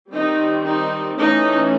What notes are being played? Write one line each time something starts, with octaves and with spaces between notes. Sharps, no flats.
D#3 G3 C4 D#4
D#4
E3 A3 C#4 D#4